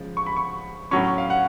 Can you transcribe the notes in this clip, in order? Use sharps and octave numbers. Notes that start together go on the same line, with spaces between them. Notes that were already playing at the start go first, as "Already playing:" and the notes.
Already playing: C#3 F3 G#3
C#6
B5
C#6
A2 F#3 C#4 C#6
F5
F#5